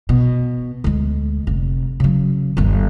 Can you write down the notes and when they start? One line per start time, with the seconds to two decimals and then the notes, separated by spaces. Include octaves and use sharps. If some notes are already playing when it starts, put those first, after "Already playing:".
0.09 B2
0.84 D2 G#3
1.47 F1
2.00 C#3 F#3
2.57 G1 D#2